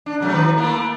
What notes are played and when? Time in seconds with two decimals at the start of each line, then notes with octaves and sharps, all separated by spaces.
0.06 D4
0.20 C3 F#3 A3
0.34 D#3 B4
0.57 A3 A#3 E4